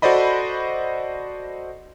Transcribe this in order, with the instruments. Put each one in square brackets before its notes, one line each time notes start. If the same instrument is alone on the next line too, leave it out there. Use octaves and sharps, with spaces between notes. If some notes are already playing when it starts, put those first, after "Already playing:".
[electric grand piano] F#4 A4 C5 D5 D#5 B5